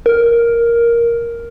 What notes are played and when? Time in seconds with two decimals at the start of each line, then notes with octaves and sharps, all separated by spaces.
0.06 A#4